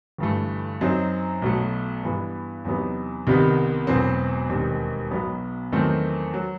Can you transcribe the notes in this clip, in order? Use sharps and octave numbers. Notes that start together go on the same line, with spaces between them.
G1 G2 E3 A3
F#2 F#3 C4 D#4
B1 B2 F#3 A3
G2 E3 B3
E2 C3 F#3 B3 D#4
C2 C3 D#3 G3 B3
E1 E2 B2 F#3 C4
E1 D#2 D#3 G3 C4
B1 B2 F#3 B3
E2 D#3 F#3 A3 C4
F#3